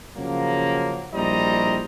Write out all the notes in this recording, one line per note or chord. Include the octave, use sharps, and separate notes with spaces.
C#3 F3 F#3 A#3
A#1 G3 E4 C5 D#5 A#5